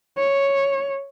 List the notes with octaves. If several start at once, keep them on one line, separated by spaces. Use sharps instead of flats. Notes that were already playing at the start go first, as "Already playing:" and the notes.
C#5